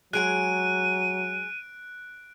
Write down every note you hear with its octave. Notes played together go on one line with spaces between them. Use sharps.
F#3 G#3 G#4 G#5 F#6 D7 D#7